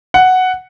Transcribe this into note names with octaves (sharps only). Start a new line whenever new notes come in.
F#5